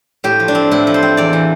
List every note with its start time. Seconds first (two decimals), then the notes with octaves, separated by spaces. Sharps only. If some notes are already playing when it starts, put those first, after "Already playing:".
0.24 A2 G4
0.40 F3
0.48 D4
0.55 C4
0.71 A2 E4
0.87 F3
0.94 C5
1.02 C4
1.17 E2 D5
1.33 E3